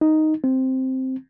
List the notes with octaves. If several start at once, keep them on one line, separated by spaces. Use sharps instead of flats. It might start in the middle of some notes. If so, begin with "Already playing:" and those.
D#4
C4